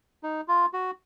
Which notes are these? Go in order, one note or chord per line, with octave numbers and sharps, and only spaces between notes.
D#4
F4
F#4